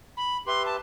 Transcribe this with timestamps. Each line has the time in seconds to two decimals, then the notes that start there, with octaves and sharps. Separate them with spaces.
0.17 B5
0.46 G4 B4 E5 C6
0.66 A5